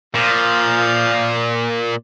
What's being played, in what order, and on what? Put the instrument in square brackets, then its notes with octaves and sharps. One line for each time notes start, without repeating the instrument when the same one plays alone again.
[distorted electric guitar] A#2 [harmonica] F3 F5